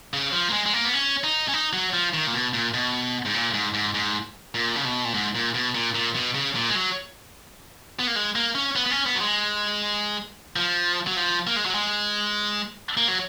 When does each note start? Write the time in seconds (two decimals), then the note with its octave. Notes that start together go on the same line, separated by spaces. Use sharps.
0.13 C#3
0.33 F3
0.49 A#3
0.53 G#3
0.66 G#3
0.73 A#3
0.85 B3
0.93 C#4
1.24 D#4
1.48 C#4
1.54 D#4
1.73 F#3
1.93 F3
2.14 D#3
2.27 A#2
2.34 B2
2.54 A#2
2.74 B2
3.25 G#2
3.34 A#2
3.54 G#2
3.74 G#2
3.95 G#2
4.55 A#2
4.76 C#3
4.85 B2
5.05 A#2
5.14 G#2
5.35 A#2
5.55 B2
5.75 A#2
5.95 A#2
6.15 B2
6.35 C#3
6.55 A#2
6.69 G#3
6.75 F#3
7.99 B3
8.07 A#3
8.16 G#3
8.36 A#3
8.55 C#4
8.75 B3
8.86 B3
8.91 C#4
9.06 B3
9.15 F#3
9.21 G#3
10.56 F3
11.07 F#3
11.17 F3
11.47 A#3
11.56 G#3
11.66 F#3
11.75 G#3
12.97 A#3
13.08 F#3